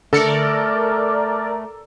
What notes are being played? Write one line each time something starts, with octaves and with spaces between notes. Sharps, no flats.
D3 A3 A4 A#4 D5 C#7